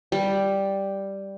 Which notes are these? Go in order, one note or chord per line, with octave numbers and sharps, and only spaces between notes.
G3